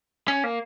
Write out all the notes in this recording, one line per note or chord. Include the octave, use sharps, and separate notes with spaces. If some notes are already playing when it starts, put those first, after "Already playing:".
C#4
A#3